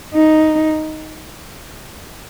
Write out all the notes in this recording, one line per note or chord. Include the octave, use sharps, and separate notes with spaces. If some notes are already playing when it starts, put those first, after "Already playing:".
D#4